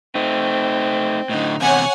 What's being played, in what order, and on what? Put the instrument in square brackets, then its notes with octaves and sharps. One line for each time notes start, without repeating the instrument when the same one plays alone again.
[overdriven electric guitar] A3 D#4 [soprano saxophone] C4
[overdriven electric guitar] A2 D3 [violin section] D#4
[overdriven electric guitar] E2 C3 [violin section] C#5 F#5 G#5